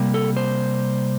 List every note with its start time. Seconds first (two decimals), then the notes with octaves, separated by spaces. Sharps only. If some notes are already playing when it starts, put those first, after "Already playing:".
Already playing: C3 G3 A#3
0.14 A4
0.37 C5